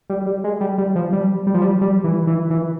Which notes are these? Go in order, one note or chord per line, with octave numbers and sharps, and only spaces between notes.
G3
G3
G#3
G3
G3
F3
G3
G3
F3
G3
G3
E3
E3
E3